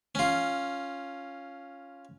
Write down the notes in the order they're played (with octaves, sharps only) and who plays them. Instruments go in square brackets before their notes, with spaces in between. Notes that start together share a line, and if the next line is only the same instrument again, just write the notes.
[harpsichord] C#4 F4